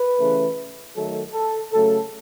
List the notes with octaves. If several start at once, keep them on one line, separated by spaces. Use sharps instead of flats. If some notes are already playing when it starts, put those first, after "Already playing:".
Already playing: B4
C#3 E3 A3
D#3 F#3 A3 A4
A4
C#3 F#3 A3 A4